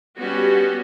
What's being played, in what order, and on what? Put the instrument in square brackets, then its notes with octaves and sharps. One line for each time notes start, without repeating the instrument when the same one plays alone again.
[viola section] G3 B3 C#4 F#4